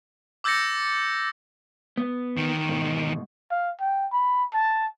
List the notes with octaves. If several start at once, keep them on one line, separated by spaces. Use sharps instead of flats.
D6 E6 G6 A6 A#6 C#7
B3
E2 D#3
G#2 B2
F5
G5
B5
A5